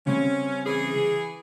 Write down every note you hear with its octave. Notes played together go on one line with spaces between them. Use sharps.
C#3 G3 C4 C#4
E3 G#4